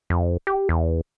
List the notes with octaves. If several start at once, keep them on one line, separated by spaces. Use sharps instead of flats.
F2
G4
E2